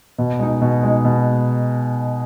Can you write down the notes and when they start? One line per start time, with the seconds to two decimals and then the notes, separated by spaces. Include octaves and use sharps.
0.18 B2
0.39 G#3 D#4
0.62 B2
0.83 G#3 D#4
1.05 B2